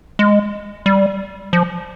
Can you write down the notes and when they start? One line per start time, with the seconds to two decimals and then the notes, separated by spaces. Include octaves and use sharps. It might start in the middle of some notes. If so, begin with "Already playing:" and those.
0.19 G#3
0.86 G3
1.53 F3